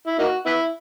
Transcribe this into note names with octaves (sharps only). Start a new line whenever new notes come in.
E4
A#3 D#4 F#4
B3 E4